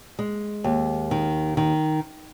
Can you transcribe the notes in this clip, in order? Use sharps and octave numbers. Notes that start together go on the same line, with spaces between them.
G#3
D#2
D#3
D#3